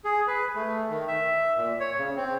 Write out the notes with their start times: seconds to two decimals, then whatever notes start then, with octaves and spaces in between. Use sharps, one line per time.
0.04 G#4
0.28 B4
0.55 A3
0.90 D#3
1.08 E5
1.57 A#2
1.80 C#5
1.98 C#3
2.16 C4